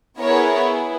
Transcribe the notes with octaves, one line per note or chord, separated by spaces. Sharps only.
B3 E4 G#4 A#4 C#5